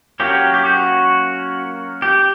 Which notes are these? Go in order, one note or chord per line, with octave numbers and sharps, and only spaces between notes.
F#3 A#3 C#4 G4
G4
F#4
G4